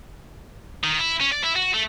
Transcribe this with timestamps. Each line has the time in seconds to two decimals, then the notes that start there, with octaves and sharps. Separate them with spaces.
0.84 D#3
0.99 E4
1.20 C#4
1.31 D5
1.44 E4
1.55 F#4
1.74 A3